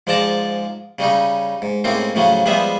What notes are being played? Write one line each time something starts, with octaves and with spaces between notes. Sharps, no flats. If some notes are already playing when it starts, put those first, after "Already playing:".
G#2 F3 G#3 D5 A5 A#5
C#3 G3 C#4 D#4
G#2
A2 G#3 A#3 C4 C#4
A2 C#3 F3 F#3 C#4
F3 G3 G#3 B3 G#4 E5